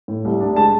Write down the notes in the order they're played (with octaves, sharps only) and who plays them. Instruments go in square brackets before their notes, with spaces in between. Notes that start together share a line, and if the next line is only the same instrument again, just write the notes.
[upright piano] A2
C2
D4
G#3 A5